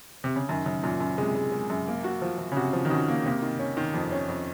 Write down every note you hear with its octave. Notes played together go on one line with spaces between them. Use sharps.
C3
C#3
F#2 D#3
F#2 C#3
F#2 A#2
F#2 A#2
C3 G#3
G#3
G#3
F#2
A#3
F#4
F3
F3
C#3
C3 F#4
F3
D#3
C#3 F#4
A#3
C3 A#3
D#3
C#4
D#3
F2
C#4
F2